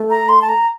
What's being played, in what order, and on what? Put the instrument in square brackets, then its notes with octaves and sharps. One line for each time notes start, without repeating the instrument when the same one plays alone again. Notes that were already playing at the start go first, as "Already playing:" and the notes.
Already playing: [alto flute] A3
[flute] A#5
C6
A5
A#5